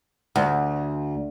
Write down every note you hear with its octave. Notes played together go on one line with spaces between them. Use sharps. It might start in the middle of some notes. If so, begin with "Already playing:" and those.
D2